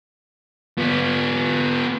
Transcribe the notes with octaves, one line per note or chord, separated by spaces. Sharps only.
B3 F4